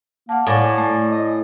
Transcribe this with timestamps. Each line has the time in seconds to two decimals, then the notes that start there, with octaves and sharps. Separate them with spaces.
0.29 A#3 F#5 A5
0.47 A2 D5 G#5 D6
0.78 A3 G#5
1.11 D#5